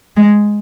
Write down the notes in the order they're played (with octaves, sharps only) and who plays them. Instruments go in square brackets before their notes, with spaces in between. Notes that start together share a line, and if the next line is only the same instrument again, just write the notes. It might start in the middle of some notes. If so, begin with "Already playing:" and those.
[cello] G#3